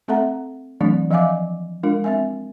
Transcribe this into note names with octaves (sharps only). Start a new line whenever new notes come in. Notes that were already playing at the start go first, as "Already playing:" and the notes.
A3 C4 A4 E5 F#5 A#5
E3 F#3 A3 C4 D4 D5
F3 D5 E5 F5 G#5 D6
G#3 D4 F4 A#4
C4 E5 G#5